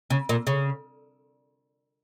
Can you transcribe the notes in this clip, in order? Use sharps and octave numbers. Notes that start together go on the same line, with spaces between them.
C#3
A#2
C#3